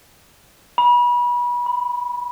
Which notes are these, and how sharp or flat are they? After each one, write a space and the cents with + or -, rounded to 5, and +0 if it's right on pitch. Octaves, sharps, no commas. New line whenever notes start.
B5 -30
B5 +15